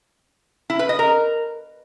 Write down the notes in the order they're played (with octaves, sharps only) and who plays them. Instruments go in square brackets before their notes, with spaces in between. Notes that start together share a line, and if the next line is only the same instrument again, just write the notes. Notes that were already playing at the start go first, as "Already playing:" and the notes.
[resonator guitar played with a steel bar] E4
B4
D#5
A#4